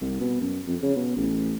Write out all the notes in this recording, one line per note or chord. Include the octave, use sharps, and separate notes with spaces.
C2
B2
F#2
F2
C#3
B2
A1